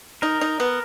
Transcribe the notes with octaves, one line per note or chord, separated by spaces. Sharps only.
D#4 A#4
D#4
B3